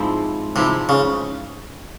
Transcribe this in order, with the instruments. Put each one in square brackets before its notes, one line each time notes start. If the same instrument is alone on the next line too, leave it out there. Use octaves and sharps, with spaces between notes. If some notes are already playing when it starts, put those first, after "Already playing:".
Already playing: [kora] G#2 F3 C4 E4
[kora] G#2 F3 C4 E4 [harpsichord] C3
[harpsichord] C#3